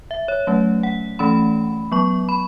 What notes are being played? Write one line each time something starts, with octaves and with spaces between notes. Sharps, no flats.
E5
C#5
F#3 A3 C#4
F#5
E3 A3 C#4 B5
F#3 B3 C#6
B5